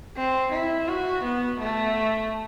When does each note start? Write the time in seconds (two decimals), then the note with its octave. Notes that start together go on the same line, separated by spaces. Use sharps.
0.17 C4
0.53 E4
0.88 F#4
1.25 B3
1.61 A3